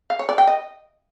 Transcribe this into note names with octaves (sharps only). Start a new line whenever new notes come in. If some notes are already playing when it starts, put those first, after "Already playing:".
F5
C#5
D5
G5
D#5